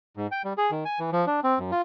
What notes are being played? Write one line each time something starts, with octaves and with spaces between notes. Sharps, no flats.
G#2
G5
G3
G#4
D#3
G#5
E3
F3
D4
C4
F#2
F4